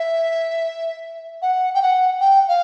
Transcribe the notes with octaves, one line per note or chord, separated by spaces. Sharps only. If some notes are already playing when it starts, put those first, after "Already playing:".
Already playing: E5
F#5
G5
F#5
G5
F5